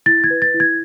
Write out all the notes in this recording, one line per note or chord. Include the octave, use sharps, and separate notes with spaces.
E4 A6
G#6
B4
A6
E4
G#6